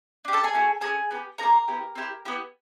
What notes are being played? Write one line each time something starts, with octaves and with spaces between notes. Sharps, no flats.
D4 G4
A4 A5
G#4 G#5
A3 C#4 F#4 A4
C#4 F#4 G#4 A4 G#5
B3 D#4 G4
A#3 D#4 G#4 A#4 A#5
B3 E4 G4
C4 E4 G4
B3 E4 G4